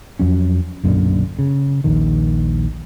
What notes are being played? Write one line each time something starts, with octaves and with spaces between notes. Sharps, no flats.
F2 F#3 C#4
B1 F#2 A#2 D3
C#3
A#1 D#2 D#3